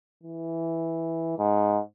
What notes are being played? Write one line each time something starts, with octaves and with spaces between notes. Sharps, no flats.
E3
G#2